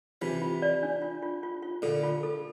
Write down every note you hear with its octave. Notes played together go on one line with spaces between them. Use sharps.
C3 E3 F4
F4
D5
D4
F4
F4
F4
F4
A#2 D3 A4
F4
A4